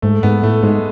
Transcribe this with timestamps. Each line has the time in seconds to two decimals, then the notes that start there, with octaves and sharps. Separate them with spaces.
0.02 G#2 A3
0.23 G#2 B3
0.43 A2 A3
0.63 G#2 G#3